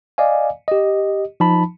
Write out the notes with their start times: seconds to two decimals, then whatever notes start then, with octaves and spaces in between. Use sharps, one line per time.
0.18 D5 D#5 F5 G#5
0.68 G4 D#5
1.40 F3 D#4 A5 B5